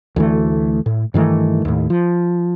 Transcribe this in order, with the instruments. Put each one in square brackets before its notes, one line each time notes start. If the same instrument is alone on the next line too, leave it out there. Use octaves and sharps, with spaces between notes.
[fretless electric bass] D2 E3 A3
A2
G2 D#3 E3 A3
D#2 A2
F3